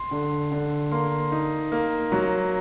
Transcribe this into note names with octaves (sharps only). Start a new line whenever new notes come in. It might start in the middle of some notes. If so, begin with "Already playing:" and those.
Already playing: C6
D3
D3
A#3 C6
D#4
A#3
F#3